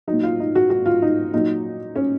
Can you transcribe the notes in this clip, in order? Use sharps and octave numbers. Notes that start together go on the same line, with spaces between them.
A#2 F#3 D#4
F4
D#4
F#4
F#4
F4
D#4
A#2 F#3 D#4
C#4